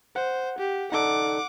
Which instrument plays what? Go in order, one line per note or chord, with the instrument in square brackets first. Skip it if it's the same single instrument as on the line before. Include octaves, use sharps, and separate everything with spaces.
[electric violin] C5 [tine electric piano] F#5
[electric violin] G4
[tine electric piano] D#4 A4 D5 [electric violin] F#5 D6